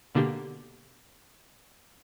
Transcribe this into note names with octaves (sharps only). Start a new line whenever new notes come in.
B2 D3 A#3 D4 G4